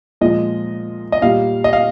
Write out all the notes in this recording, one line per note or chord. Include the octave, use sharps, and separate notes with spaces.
A#2 F3 G#3 D#5
D#5
A#2 G3 F5
D#5
F5